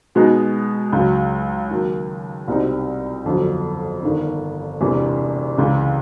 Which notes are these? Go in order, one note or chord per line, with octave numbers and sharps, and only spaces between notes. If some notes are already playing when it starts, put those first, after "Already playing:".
B2 G#3 B3 D#4
C#2 C#3 F#3
D#2 D#3 F#3
C2 B2 G3 C4 D#4
G1 F2 D3 F#3
G1 G2 D#3
E1 E2 C3 E3
C#2 C#3 E3